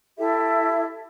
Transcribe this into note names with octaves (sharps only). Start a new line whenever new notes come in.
E4 G4 A4 E5